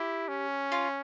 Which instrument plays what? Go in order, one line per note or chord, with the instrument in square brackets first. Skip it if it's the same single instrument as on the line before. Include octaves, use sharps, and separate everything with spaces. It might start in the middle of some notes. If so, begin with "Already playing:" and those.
Already playing: [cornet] E4 [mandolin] G4
[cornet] C#4
[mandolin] F4